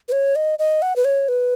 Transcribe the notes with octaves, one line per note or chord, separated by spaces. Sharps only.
B4
C#5
D#5
D#5
F#5
B4
C#5
B4